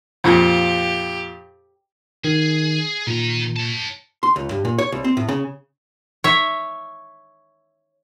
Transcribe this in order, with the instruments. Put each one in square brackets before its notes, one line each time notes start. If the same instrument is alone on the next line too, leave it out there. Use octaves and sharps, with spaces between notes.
[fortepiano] F2 A#2 [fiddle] G4
[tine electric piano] D#3 [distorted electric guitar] G#4
[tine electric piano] A#2 [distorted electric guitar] D#3 A#5
[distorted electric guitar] C#5 A5
[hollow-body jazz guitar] C6
C#2
G2
A#2
C#5
C2
C4
A2
C#3
[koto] C#5 E5